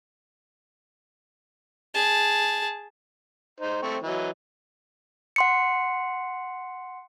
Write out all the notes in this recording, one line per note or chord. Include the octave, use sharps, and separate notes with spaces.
G#4 A5
D#4 C5
A3 C4 C#6
E3 F#3 D#5
F#5 C6 C#7